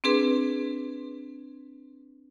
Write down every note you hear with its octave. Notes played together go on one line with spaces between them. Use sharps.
C4 D4 G#4 B4